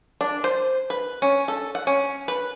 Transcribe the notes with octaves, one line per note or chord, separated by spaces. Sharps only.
D4
C5
B4
C#4
A4
F#5
C#4
B4